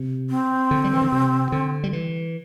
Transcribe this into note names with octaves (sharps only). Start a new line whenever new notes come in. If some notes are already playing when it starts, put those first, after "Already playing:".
Already playing: C3
C4
D3
G3
E3
D3
C3
D3
G3
E3